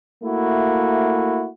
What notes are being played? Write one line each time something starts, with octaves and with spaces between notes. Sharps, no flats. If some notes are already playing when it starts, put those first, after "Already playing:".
A3 A#3 E4 F#4